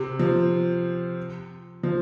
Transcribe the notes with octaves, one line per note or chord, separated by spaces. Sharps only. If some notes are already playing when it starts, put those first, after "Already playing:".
Already playing: C3
F3
F3